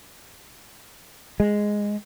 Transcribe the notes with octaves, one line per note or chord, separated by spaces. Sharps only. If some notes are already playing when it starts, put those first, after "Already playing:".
G#3